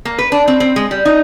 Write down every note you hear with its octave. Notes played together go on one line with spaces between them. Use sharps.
A#3
B4
D4
C4
C4
G#3
G3
D#4